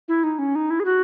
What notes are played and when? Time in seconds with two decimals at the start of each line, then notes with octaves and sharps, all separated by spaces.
0.08 E4
0.24 D#4
0.39 C#4
0.55 D#4
0.70 E4
0.80 G#4
0.85 F#4